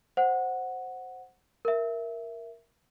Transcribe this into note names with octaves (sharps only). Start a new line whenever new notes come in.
C5 F#5
A#4 E5